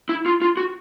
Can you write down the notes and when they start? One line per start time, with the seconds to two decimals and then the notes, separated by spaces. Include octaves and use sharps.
0.09 E4
0.26 F4
0.42 F4
0.57 F#4